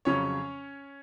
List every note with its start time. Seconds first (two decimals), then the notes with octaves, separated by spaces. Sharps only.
0.05 F2 C#3 F#3 C#4 C#5